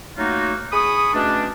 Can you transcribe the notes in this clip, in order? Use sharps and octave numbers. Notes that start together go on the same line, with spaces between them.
F#3 A3 A#3 D#4 F4 F#4
G#4 B5 C#6 D#6
B2 A3 C#4 D4